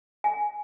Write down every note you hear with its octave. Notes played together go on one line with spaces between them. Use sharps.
G#5